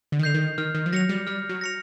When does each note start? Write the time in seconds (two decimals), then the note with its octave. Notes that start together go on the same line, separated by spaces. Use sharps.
0.12 D3
0.19 D#3
0.23 D3 G6 C7 F7
0.34 D#3
0.58 D#3 F6
0.75 D#3
0.86 F3
0.93 F#3 A#6 C#7 F7
1.09 G3
1.27 G3 F6
1.49 F#3
1.61 A#6 C#7 F7